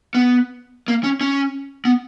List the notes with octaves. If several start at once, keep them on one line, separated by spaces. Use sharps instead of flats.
B3
A#3
C#4
C#4
B3